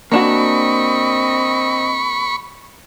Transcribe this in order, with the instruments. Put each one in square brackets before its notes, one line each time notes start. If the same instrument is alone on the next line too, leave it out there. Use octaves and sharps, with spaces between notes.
[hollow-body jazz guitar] A#3 D4 F#4 [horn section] C4 D#5 [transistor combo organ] B5 C#6